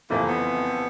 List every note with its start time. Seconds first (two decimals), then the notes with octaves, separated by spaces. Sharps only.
0.10 F#1 F2 C3 E3 A3 A#3
0.27 B3